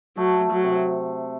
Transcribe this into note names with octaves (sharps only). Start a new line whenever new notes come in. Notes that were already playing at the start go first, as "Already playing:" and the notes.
F#3 A3
A3
F#3
C3